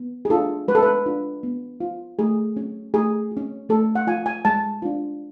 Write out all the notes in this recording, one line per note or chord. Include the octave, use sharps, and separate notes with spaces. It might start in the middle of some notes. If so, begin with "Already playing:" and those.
Already playing: B3
G#4
D4 F4 A4
G#3 B4
A4
B4
D4 F4
B3
F4
A3 G#4
C#4 F#4
A3 G#4
F#4
C#4
A3 A4
F#5
F4 G#5
G#5
G#3 A5
D4 F4